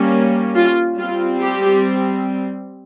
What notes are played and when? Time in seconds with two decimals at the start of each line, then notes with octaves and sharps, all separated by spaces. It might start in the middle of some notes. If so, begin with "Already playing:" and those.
Already playing: G3 A#3 C#4
0.55 F4
0.98 G3 C4 F4
1.42 G4